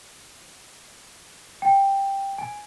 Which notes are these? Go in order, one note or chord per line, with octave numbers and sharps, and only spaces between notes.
G5
G#5